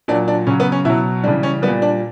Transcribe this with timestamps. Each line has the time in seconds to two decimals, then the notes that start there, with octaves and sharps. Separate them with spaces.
0.08 A#2 F#3 D4
0.28 D4
0.47 C#3 F#3 C#4
0.60 B3
0.72 C#4
0.85 B2 F#3 E4
1.24 G3 D4
1.26 C#3 E3
1.43 C#4
1.62 G3 B3
1.68 A#2
1.82 D4